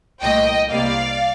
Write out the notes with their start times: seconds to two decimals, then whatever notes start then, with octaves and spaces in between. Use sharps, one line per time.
0.22 C2 A#2 A3 D#5 G5
0.70 C2 C3 G3 A#3 D5 F5